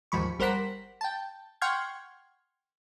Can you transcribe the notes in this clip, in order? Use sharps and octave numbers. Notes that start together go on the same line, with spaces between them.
D#2 G#2 F3 B5 C#6
G1 G3 A#4 C5 F#5 B6
G5 A5
F#5 G5 C6 C#6 F6 G#6